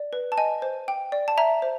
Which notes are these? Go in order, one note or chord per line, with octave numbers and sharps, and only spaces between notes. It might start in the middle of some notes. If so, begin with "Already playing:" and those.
Already playing: D5
B4
A5
D#5 G#5
C5
G5
D5
A5
E5 A#5
C5